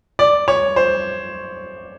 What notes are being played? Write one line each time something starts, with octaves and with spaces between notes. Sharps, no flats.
D5
C#5
C5